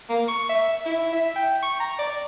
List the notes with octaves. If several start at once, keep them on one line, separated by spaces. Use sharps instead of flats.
A#3
C#6
E5
E4
E5
G5
C#6
A#5
D5